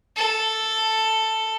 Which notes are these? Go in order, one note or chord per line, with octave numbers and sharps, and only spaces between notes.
A4